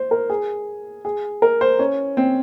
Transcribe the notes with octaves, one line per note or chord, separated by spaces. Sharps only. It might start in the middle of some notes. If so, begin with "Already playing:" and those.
Already playing: C5
A#4
G#4
G#4
A#4
C5
C#4
C4